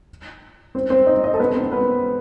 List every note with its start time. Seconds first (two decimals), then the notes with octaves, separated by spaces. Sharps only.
0.75 C4 C5
0.90 C4 C5
1.06 D#4 D#5
1.24 D#4 D#5
1.34 A4
1.39 B3 B4
1.55 C4 C5
1.72 B3 B4